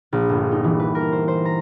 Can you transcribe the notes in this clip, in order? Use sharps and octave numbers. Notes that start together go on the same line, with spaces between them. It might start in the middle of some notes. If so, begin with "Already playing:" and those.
A#1
G1
D#4
E3
B4
A#4
C5
C5
A#5